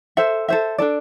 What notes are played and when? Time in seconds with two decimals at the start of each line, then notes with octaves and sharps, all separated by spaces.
0.17 A4 C5 E5
0.48 A4 C5 E5
0.78 D4 A4 D5